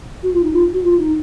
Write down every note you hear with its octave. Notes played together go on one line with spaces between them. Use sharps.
F#4
F4
D#4
F4
F#4
F4
D#4